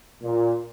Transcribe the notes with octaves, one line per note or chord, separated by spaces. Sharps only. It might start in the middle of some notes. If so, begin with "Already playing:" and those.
A#2